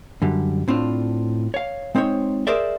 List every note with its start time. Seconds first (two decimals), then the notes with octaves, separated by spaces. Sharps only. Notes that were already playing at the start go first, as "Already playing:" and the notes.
0.22 F#2 D3 G3
0.68 A2 C4 D4 F4
1.54 C#5 F5
1.95 G#3 C4 D#4 C5 C#5
2.47 G#4 A#4 C5 D5 E5